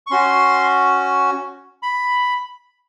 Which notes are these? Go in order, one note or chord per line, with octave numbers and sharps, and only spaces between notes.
C#6
C#4 F#4 C6
B5